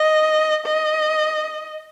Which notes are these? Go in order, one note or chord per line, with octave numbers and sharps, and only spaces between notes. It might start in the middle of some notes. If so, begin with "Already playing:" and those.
Already playing: D#5
D#5